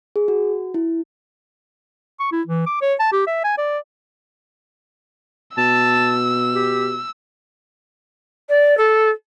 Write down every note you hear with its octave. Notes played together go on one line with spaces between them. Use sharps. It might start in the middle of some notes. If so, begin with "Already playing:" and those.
G#4
F#4
E4
C#6
E4
E3
D6
C#5
A5
G4
E5
G#5
D5
B2 A5 E6
G4
D5
A4